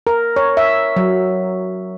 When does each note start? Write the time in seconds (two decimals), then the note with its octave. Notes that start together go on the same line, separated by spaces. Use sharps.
0.07 A#4
0.36 C#5
0.57 E5
0.96 F#3